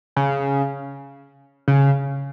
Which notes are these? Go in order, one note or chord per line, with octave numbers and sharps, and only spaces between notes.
C#3
C#3